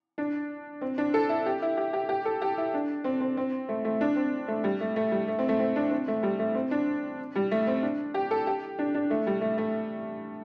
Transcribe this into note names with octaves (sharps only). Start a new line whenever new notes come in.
D4
C4
D4
A4
E4
G4
E4
G4
G4
G4
A4
G4
E4
D4
C4
C4
C4
A3
A3
D4
C4
A3
G3
A3
A3
G3
A3
C4
A3
C4
D4
C4
A3
G3
A3
C4
D4
G3
A3
C4
D4
G4
A4
G4
D4
D4
A3
G3
A3
A3